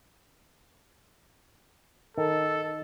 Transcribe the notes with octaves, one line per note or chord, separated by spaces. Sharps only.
D#3 A4